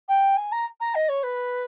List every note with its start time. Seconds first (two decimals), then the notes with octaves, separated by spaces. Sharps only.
0.08 G5
0.37 G#5
0.52 A#5
0.80 A#5
0.95 D#5
1.09 C#5
1.23 B4